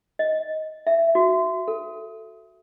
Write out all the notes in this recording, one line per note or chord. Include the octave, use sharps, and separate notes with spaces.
D#5
E5
F#4
A4